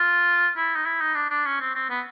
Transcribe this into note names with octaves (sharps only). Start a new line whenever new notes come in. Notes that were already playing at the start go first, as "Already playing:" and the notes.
Already playing: F4
E4
D#4
E4
D#4
D4
D4
C#4
C4
C4
B3